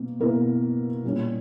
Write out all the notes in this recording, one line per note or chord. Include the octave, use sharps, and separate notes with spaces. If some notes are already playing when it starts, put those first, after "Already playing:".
Already playing: B2 A#3
B2 A#3 E4 A#4
A#2 G3 C#4 E4